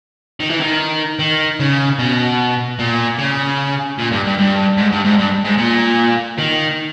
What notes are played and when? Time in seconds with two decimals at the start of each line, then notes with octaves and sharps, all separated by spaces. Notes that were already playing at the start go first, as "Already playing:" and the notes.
0.40 D#3
0.50 E3
0.60 D#3
1.19 D#3
1.60 C#3
1.99 B2
2.79 A#2
3.19 C#3
3.99 A#2
4.12 G2
4.25 G2
4.38 G2
4.78 G#2
4.92 G2
5.05 G#2
5.18 G2
5.44 G#2
5.58 A#2
6.38 D#3